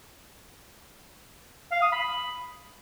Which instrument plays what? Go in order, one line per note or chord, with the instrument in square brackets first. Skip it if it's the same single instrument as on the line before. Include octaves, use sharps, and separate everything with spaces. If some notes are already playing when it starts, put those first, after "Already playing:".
[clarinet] F5
D#6
B5